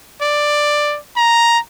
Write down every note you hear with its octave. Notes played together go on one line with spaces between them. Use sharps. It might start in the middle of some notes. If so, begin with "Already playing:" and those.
D5
A#5